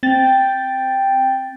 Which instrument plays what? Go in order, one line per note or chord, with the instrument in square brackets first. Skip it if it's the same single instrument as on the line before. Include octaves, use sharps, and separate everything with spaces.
[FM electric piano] C4 A6 [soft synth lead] G5